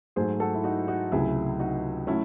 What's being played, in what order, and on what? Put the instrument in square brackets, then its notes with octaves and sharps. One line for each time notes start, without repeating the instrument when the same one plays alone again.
[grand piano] G#2 F#3 A3 G#4 C5
F#4 A4
E4
D#4 F#4
D#4 F#4
C#2 C3 F#3 A3 E4 G#4
D#4 F#4
F#3 A3 C#4 E4